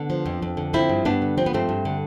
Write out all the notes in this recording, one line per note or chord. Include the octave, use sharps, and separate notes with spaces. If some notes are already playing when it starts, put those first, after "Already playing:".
Already playing: D3 B3 D4
F3
F2
F2
D3
F3 C4 E4
G2
G2 B3 D4
D3
F3 C4
B3
G2 A3 C4
G2
D3